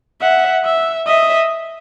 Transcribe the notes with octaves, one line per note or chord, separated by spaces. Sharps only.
E5 F#5
E5
D#5 E5